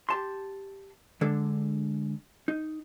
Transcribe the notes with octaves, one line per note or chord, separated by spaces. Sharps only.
G4 A5 C6
D3 G#3 D4 A4
D#4